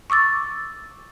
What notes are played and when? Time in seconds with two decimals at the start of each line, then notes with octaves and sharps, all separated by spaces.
0.10 C#6 D6 E6 A6